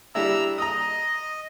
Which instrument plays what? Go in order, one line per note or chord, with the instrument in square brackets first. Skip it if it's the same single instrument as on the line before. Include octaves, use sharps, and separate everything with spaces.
[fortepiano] G3 D4 E4 [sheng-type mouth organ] A#5 E6
[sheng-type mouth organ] D#5 [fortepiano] A#5 D#6